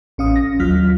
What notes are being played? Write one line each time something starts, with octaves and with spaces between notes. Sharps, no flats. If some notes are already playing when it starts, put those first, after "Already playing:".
A1 C#4 F5 D#6
A#6
D#2 F#3 F4 F6 B6